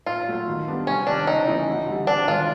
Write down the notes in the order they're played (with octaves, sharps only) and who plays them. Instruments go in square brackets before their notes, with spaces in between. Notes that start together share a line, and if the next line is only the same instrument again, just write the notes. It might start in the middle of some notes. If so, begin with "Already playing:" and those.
[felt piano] A#2 [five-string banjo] F4
[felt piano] F#3 A3
D#3
G3 B3 D4
[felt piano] C2 [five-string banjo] C#4
[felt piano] C3 D#3 [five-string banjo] D4
[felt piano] C#3 [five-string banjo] D#4
[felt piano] E3 A3 C#4 E4
D2
D3 G3
[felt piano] C3 [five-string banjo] D4
[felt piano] D#3 G#3 [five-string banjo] F4